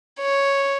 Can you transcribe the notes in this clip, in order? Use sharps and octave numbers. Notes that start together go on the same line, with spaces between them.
C#5